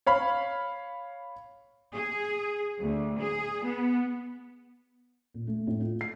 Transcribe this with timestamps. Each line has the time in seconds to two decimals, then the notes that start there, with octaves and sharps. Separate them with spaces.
0.07 C#5 F5 B5
1.94 G#4
2.80 D2
3.20 G#4
3.65 B3
5.34 A#2
5.47 A3
5.67 A2
5.80 F4
6.01 C7